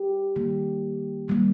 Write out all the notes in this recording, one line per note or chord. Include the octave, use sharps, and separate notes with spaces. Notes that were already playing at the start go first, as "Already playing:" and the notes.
Already playing: G4
D#3 G3 A#3
D#3 G3 A#3